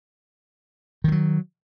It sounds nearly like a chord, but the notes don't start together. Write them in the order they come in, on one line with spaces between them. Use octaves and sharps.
D#3 F3 F#3